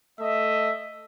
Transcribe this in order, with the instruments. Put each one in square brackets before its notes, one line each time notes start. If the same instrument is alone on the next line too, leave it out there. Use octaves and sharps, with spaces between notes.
[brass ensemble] A3 D#5 E5